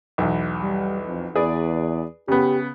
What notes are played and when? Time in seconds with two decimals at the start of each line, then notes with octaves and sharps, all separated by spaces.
0.18 B1 E2
0.62 G3
1.07 F2
1.35 E2 G#4 B4 D5
2.28 C#3 B3 G4